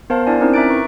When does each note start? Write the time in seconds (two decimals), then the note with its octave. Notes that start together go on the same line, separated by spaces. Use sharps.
0.10 B3 A#4 C5 F5 A5
0.27 D4 E4 D5 G#5
0.41 C4 C#4 D#4 E4 A#4 C5
0.54 E5 A#5 D6 F#6 A6 D7
0.69 B4 C#6